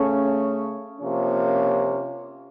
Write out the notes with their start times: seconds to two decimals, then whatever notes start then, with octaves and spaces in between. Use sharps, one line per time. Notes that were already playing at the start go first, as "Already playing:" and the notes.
Already playing: C#3 A3 C#4
1.01 C3 F3 A#3 C#4